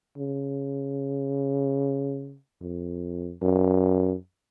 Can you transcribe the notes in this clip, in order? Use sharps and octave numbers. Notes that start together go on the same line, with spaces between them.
C#3
F2
F#2